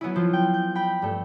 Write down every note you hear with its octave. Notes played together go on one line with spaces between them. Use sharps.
F#3 B3 C#4 E4
F3 F4
G5
G6
G5 B5
G2 A3